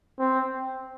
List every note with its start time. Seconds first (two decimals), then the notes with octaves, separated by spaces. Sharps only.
0.19 C4